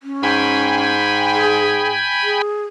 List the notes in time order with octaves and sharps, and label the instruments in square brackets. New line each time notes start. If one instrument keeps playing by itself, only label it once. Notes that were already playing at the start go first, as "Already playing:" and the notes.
[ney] C#4
[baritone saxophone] G#2 [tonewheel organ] G5 G#5 B5
[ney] G#4
G#4